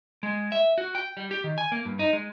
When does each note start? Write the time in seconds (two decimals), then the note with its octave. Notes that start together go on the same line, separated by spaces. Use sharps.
0.23 G#3
0.52 E5
0.78 F#4
0.95 G5
1.17 G3
1.31 G4
1.44 D#3
1.58 G#5
1.72 A#3
1.85 G2
1.99 D#4
2.13 G#3